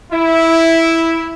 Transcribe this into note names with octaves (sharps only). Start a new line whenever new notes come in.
E4